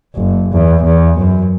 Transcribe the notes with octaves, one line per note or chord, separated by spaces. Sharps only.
F#1
E2
E2
F#2